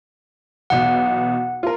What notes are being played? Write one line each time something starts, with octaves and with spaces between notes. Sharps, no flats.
B1 E2 B2 F#5
F4 A#4